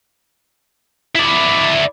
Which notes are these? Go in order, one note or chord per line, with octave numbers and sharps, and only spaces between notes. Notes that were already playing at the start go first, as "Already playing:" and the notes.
E4 D5